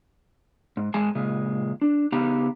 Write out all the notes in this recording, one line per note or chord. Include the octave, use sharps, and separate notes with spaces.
G#2
G#2 G#3 G#4 G#5 A5
A#2 C#3 G#3
D4
C#3 B3 D#4 G4 F5 A#5